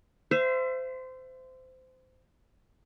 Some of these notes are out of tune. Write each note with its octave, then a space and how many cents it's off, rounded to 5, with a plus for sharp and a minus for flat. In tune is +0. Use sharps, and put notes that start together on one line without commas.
C5 -20 E5 +30